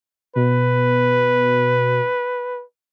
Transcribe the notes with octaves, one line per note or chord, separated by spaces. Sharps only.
B2 B4